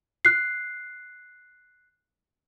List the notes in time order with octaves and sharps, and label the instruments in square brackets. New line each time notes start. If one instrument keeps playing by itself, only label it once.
[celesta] F#6 C7